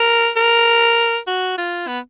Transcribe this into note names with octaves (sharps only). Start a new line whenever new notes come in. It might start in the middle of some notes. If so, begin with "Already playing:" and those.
Already playing: A#4
A#4
F#4
F4
B3